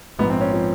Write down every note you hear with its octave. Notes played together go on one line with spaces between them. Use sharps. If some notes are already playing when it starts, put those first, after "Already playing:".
A#1 G#2 F3 B3
C4
C#4
F3 C#4